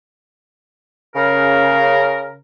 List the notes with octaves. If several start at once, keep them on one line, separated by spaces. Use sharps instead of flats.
C#3 A#4